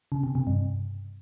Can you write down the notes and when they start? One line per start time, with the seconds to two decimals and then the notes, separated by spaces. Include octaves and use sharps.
0.12 C#3
0.23 C3
0.35 C3
0.47 G2